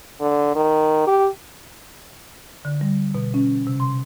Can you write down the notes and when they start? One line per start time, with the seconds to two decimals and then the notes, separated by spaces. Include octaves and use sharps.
0.21 D3
0.55 D#3
1.07 G4
2.65 D3
2.81 G3
3.15 B2
3.34 C#4
3.67 C3
3.80 C6